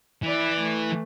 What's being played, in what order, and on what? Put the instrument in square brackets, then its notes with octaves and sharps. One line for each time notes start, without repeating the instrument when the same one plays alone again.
[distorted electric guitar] E3 [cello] E4 D5
[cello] A3